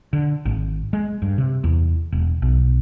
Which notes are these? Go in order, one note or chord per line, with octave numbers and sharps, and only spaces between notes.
D3
G#1
G#3
G2
C3
E2
E1
B1